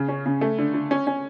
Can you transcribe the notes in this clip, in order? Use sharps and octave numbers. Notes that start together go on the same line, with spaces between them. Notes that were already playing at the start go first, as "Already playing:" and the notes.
Already playing: C#3
C#4
C#3
A3
D3
D3
C#4
C#4